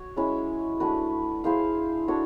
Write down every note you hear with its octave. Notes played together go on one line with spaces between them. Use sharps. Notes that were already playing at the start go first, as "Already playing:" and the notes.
Already playing: F#4 C#5
G#3 C#4 E4
A3 D4 F#4 B4
E4 G#4 C5 F5
D4 F#4 A4 C#5